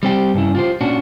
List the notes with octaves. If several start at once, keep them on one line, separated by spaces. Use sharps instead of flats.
G3 C4 G4
G2 C#3 E4
F4 G4 C5
A#2 C#4 D4 F#4